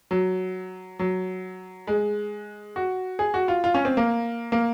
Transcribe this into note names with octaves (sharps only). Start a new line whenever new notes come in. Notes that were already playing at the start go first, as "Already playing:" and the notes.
F#3
F#3
G#3
F#4
G#4
F#4
F4
F4
C#4
C4
A#3
A#3